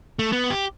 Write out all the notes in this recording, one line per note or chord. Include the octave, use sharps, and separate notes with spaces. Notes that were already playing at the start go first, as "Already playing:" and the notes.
A3
B3
G4